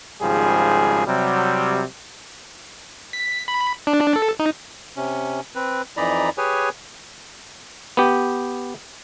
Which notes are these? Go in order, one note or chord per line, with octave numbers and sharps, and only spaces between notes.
G#1 G#2 C#3 F3 G3 G#4
C3 F#3 G3
B6
B5
D4
D4
A4
D#4
C3 C#4
C4 B4
F2 E3 D#4 D5 A#5 B5
G4 G#4 B4 C#5 G#5
B3 G4